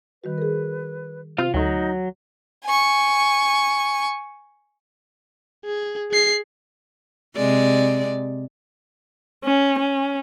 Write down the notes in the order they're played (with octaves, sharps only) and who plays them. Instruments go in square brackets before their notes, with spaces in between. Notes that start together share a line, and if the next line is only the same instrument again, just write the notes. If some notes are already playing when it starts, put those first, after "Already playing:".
[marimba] D#3 G3 F#4 [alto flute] B4
[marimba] G#4 A#4
[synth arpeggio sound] C3 C4 [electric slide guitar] F4 F5
[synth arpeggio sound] D2 A3 [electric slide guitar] F#3 [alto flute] D#4
[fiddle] G#5 C#6
[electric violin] G#4
G#4 C7
[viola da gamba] C3 G#3 D5
[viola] C#4
C#4